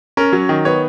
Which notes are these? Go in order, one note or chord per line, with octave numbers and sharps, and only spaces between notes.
C#4 A#4
F#3
D#3
B3 C#5